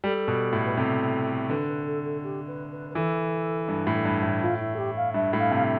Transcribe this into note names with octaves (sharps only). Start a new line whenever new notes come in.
G3 A4
B2
A2
B4
C3 A4
D3 B4
B4
A4
A4
G4
B4
B4
B4
E3 A4
G2
A2
G2
A2
F4
E4
A4
G4
F5
G2 E5
A2
F5
C3
F5
E5